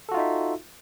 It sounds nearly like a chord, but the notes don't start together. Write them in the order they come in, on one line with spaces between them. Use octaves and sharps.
A4 F#4 F4 D#4 E5